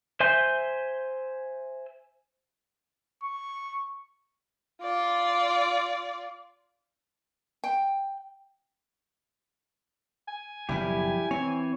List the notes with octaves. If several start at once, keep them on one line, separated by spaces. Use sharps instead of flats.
C5 E5 G#5 C6 G6
C#6
F4 D5
G5
G#5
F#1 B2 F3 G3 E4 G4
E3 C4 C#5